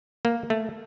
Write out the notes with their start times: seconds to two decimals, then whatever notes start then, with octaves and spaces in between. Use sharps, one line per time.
0.25 A#3
0.50 A3